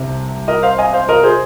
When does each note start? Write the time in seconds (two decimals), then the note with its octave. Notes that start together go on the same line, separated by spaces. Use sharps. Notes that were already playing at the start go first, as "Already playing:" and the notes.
Already playing: C2 C3
0.48 A#4 D#5
0.63 C5 F5
0.78 D#5 G#5
0.93 C5 F5
1.08 A#4 D#5
1.23 G#4 C5